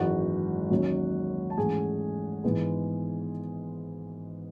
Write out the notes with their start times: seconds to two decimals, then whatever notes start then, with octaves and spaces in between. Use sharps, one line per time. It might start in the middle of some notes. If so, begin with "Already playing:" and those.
Already playing: G#1 F#2 E3 G#3 F#4 F#5
0.70 D#2 D#3 F#3 C#4
1.50 A5
1.57 G#2 E3 A3 C#4 G#4 G#5
2.44 G#1 G#2 E3 G#3 B3